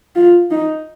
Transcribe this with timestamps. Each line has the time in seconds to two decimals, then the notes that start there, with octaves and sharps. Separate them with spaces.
0.16 F4
0.51 D#4